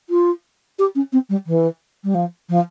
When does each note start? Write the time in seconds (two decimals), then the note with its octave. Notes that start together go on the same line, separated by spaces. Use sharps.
0.09 F4
0.78 G4
0.95 C#4
1.12 C4
1.29 G3
1.46 E3
2.03 G3
2.14 F3
2.49 F3